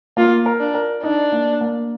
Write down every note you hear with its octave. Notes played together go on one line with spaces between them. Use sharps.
A#3 F4
A#4
D4
A#4
D4 D#4
A#3
A#3